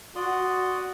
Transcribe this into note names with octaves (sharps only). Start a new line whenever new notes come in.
F#4 D5 C6 D#6